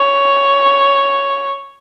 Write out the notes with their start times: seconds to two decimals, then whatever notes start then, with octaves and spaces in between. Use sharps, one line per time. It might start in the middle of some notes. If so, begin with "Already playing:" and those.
Already playing: C#5